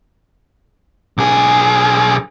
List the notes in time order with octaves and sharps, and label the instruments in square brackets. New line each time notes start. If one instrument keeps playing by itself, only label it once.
[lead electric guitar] B1 G#4